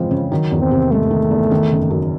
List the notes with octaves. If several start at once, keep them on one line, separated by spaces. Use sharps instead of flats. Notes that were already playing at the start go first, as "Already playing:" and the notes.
Already playing: C#3 E3 F3 G#3 C4
C#3
D#3 F#3
E2
C4
C3
G#3 A3
D#3
E2
D#3
F#1
F#2